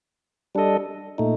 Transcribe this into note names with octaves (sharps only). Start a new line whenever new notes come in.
G3 D4 A4 D#5
A#2 A3 D#4